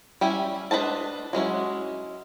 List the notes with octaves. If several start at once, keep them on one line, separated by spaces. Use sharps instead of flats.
G3 C#4 E4 G#5
D4 B4 C5 D#5 A5
F#3 G#3 C#4 E4